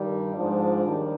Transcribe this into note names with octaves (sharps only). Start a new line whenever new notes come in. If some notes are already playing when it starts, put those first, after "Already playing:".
Already playing: G2 D#3 G3
G#2 F3 D4
D#2 D#3 G3